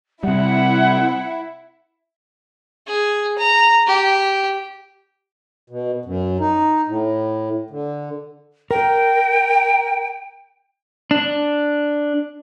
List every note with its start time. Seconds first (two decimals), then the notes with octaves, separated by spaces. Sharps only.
0.23 C3 G3 E4 F#5
2.87 G#4
3.38 A#5
3.87 G4
5.70 B2
6.05 F#2
6.40 D#4
6.87 A2
7.70 D3
8.71 A#4 G5
11.11 D4